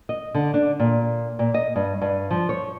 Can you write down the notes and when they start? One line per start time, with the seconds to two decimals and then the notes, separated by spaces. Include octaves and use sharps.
0.09 D#5
0.35 D3
0.54 D4
0.80 A#2
1.39 A#2
1.54 D#5
1.76 G2
2.02 G2
2.31 F3
2.49 C#5